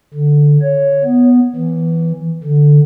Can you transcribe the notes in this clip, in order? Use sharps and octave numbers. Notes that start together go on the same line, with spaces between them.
D3
C#5
B3
E3
D3